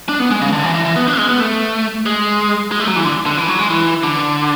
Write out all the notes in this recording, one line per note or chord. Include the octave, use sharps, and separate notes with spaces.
D4
B3
G#3
C#3
D3
E3
E3
E3
B3
D4
G#3
B3
A3
G#3
G#3
A3
F#3
E3
D3
D3
E3
F#3
G#3
E3
D3